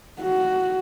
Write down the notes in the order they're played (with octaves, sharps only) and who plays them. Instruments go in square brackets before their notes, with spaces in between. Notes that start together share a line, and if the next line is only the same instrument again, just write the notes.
[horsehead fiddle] F#4